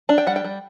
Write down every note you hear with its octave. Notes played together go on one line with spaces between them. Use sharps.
D4 A5
G5
G3 F#5
G5
G3